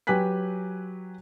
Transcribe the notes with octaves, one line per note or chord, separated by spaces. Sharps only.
F#3 G4 B4 G#5 F#6 B6